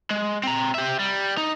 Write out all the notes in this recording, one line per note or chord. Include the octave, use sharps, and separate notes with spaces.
G#3
C4 A#5
G4 E5
G3
D#4